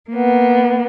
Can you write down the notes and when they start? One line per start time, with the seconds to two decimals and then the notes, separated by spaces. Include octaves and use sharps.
0.10 A#3 B3